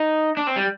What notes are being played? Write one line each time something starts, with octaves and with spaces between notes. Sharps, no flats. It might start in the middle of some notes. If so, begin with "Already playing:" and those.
Already playing: D#4
D4
C4
G3